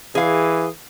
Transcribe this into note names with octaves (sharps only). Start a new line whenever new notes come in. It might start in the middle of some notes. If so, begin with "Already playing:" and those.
E3 G#4 F5